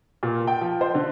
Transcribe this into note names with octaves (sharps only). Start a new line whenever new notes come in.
A#2
G5
F3
C5
D3